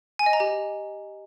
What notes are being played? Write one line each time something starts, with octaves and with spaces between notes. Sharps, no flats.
G#5
D#5
A#5
G4